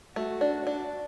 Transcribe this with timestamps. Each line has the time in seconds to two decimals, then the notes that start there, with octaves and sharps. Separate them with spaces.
0.15 A3 F#4
0.41 D4
0.67 D4